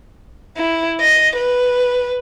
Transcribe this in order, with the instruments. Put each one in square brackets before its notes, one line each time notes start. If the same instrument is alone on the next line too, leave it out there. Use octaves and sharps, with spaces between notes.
[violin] E4
D#5
B4